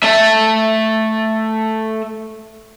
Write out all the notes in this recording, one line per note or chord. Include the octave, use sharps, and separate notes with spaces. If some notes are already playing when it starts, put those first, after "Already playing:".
A3 E5